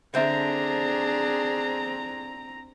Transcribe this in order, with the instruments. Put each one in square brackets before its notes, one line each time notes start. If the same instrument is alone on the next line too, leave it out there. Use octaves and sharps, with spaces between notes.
[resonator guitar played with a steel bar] D3 C5 E5 [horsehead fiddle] C4 A#5 [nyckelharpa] D4 G#4